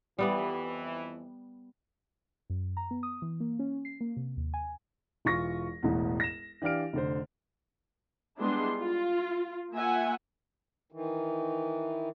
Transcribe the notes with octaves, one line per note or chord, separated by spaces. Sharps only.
F2 E3 G3 B3 D5
F#2
A#5
B3
D#6
E3
A#3
C#4
C7
A#3
C3
D#2
G#5
E1 E3 F4 C#6 A#6
E1 A1 E2
A#6 E7
E3 D4 G4 F5 F6 D7
F1 D3 C5
G3 G#3 B3 D4 E4 C6
F4
A#3 F4 E5 F#5 G#5
D#3 E3